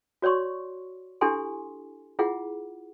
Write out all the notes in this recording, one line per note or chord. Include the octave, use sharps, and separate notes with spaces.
F#4 C#5 D5 C6 C#6
D4 E4 G4 A4 G#5 C6
E4 F4 G#4 F#5